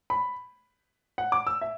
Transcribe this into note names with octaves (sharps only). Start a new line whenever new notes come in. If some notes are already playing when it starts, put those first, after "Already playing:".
B5
F#5
D6
E6
E5